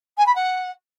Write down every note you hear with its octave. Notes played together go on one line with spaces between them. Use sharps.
G#5
B5
F#5